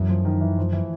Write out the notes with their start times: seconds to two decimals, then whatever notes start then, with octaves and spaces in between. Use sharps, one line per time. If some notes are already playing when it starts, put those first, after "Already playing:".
Already playing: F#2 E3
0.09 F3
0.25 D#3
0.41 E3
0.57 F3
0.73 E3